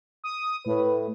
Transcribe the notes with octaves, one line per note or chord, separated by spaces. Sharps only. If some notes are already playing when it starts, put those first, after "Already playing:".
D#6
A2 B4